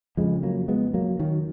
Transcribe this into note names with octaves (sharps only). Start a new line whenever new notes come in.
F2 C#3 F3 G#3
F#3 A#3
G#3 B3
F#3 A#3
D#3 F#3